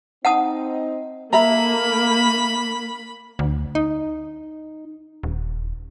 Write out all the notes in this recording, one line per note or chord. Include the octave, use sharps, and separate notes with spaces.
C4 D#4 F#5 A5 D#6
A#3 A4 E5 A#5 B5
D2
D#4
D#1